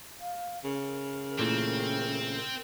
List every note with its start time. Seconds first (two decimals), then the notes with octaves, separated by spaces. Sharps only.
0.20 F5
0.64 C#3 A#4
1.39 A#2 E3 A3 C4